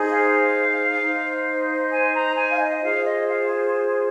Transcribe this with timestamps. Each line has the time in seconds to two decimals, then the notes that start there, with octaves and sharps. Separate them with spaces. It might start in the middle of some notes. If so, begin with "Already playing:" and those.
Already playing: D#4 G#4 C5
0.10 F5
1.00 D#4 C5
1.92 G#5
2.14 A#5
2.37 G#5
2.51 F5
2.60 D#5
2.82 F4 G#4 C5 F5
3.04 D#5
3.28 F5